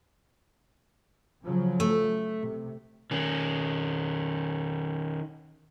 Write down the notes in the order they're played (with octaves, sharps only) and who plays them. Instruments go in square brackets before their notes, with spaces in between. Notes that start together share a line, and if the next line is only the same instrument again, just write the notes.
[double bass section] C#3 F3 F#3
[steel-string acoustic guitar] A3
[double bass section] C3
[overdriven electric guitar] D#3 C#4